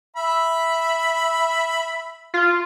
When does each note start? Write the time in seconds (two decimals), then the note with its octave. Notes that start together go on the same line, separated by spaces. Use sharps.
0.16 E5 B5
2.34 F4